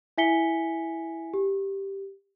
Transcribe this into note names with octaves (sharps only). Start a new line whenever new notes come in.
E4 E5 G#5 B6 C#7 G7
G4